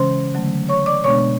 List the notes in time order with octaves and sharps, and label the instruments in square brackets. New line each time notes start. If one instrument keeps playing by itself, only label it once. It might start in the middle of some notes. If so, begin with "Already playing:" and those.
Already playing: [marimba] C#3 E3 G#3 C#4 C5 C6
D3 F#3 A3
C#5 C#6
D5 D6
B2 G#3 B3 D4 C#5 C#6